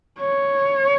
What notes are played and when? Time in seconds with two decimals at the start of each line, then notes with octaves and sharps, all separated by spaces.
0.20 C#5